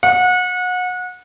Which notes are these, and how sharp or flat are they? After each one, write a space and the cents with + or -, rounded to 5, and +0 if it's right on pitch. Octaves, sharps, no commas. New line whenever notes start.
F#5 -30